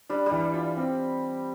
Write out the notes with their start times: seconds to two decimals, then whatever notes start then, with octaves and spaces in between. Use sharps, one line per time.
0.09 G3 D4
0.26 G3
0.31 E3
0.54 F4
0.77 C4